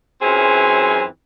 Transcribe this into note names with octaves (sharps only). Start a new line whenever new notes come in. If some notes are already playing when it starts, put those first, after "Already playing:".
F#2 E3 F#3 C4 F4 G#4